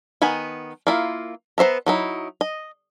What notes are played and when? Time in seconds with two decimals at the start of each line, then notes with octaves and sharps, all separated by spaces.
0.22 D#3 B3 G#5 B5
0.87 A#3 E4 F4
1.58 B3 C5 E5 A#5
1.86 F#3 D#4 E4
2.41 D#5